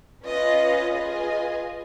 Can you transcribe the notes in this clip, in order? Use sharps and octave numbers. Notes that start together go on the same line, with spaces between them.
C#4 F4 B4 D#5
F4 G#4 B4 D#5 G#5